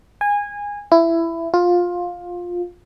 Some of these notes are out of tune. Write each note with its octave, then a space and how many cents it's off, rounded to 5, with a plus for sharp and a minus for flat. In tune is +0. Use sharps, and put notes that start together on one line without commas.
G#5 -20
E4 +15
F4 +15